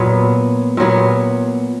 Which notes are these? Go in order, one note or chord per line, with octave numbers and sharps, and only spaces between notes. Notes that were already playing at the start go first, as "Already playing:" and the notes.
Already playing: A#2 F#3 B3
A#2 F#3 B3